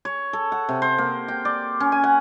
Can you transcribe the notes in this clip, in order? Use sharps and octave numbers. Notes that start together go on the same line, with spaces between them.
C#5
A4
F#5
C3
C5
A#3
G5
D5
C#4
G#5
F#5